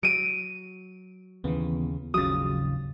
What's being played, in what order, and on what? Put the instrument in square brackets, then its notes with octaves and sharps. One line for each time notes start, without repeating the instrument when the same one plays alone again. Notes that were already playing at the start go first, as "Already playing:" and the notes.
[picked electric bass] F#3 [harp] D7 D#7
[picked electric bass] D#2 C#3 [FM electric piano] E3 B3
[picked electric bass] G#1 D#2 F3 [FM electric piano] C#3 F#3 [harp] D#6 A6